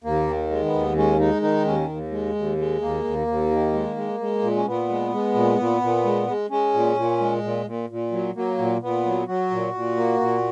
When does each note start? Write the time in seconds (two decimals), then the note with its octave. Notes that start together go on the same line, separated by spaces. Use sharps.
0.04 D#2 A#3
0.27 D#3
0.50 G#3
0.65 B3
0.73 D#2
0.96 G#3 C#4
1.19 G#3 D#4
1.42 D#3 D#4
1.65 D#2 C#4
1.89 D#2
2.11 G#3
2.35 D#2
2.57 G#3
2.81 D#2 A#3
3.04 D#2
3.27 D#2
3.51 D#3
3.73 G#3
3.96 G#3
4.20 G#3
4.42 A#2
4.56 C#4
4.66 A#2 B3
4.89 G#3
5.12 G#3
5.34 A#2
5.59 A#2
5.81 A#2
6.05 G#3
6.28 G#3
6.50 G#3 C#4
6.74 A#2
6.96 A#2
7.20 G#3
7.43 A#2
7.66 A#2
7.90 A#2
8.12 F#3
8.35 F#3 A#3
8.58 A#2
8.82 A#2 B3
9.05 F#3
9.27 F#3 F#4
9.51 A#2
9.74 A#2
9.97 A#3
10.20 A#2